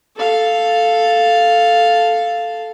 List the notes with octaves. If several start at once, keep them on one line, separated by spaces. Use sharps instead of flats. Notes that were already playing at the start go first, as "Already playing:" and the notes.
A4 F5